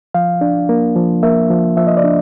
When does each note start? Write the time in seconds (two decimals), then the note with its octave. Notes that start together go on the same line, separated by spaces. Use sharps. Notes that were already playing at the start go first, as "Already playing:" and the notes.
0.14 F3 F5
0.41 D4
0.69 A#3
0.96 F3
1.23 A#3 E5
1.50 F3
1.77 F3 E5
1.87 D#5
1.97 D5
2.04 D4